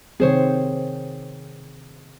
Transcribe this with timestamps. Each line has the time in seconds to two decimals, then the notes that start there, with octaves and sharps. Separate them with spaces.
0.20 C3 D#3 C4 G#4 C5 C#5